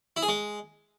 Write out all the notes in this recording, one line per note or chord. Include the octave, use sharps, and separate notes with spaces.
E4
G#4
G#3